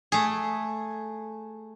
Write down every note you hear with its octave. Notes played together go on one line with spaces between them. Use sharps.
A3 G#4